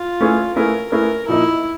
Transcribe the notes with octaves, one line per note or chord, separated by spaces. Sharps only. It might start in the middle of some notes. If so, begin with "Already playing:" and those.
Already playing: F4
A3 C#4 E4 G#4 B4
A3 C#4 E4 G#4 A#4 B4
A3 C#4 E4 G#4 A#4 B4
A#2 F3 A#3 D#4 E4